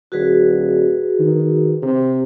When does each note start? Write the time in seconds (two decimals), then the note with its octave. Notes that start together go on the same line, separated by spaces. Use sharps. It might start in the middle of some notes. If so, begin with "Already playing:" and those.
0.12 D#1 F#4 G#4 B4
1.19 D#3
1.82 C3